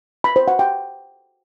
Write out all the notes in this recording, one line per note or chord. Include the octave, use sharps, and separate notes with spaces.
B5
C5
F#5
G5